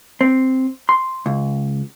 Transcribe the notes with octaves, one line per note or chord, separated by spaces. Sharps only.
C4
C6
C#2